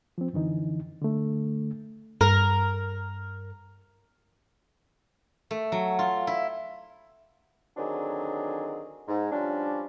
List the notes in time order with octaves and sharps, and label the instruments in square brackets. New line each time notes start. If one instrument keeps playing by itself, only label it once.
[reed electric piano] F3 C4
F#2 D3 E3 D#4
D3 A3
[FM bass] G2 [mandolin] A#4
[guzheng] A3
F#3
F4
E4
[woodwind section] D3 D#3 F#3 C4 D4 G#4
G#2
F3 G3 C#4 D4